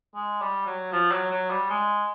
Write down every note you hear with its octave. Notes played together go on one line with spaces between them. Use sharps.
G#3
G3
F#3
F3
F#3
F#3
G3
G#3